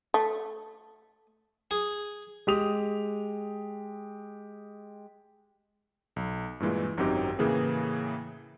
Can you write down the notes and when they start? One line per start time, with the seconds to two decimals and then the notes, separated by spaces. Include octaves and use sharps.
0.14 A3
1.71 G#4
2.47 G#3 G4 D#6 F7
6.16 B1
6.60 G2 A#2 E3 G#3
6.97 G#1 F#2 F#3 C4 D#4 G4
7.39 A2 C#3 E3 A#3 G#4